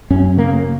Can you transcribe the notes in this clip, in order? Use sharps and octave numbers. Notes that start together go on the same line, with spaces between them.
F#2 C#4
C#3 A#3